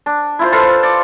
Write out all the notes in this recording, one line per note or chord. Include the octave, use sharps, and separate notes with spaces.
D4
E4 F4 C5
A4 B4 C5 F5
D5